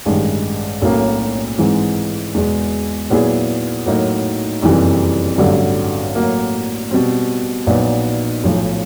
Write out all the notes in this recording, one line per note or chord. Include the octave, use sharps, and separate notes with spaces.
A1 G2 D#3 G#3
B1 A2 F#3 A#3 C#4
G#2 E3 G#3 C4
E2 B2 G#3
A#2 F#3 B3 E4 G#4
A2 F#3 A#3 D#4
F#1 F2 C3 E3 G3
A1 G2 D3 F#3
A2 F#3 A#3
B2 G3 C4
A#1 A#2 F#3 B3 D#4
B1 A2 F3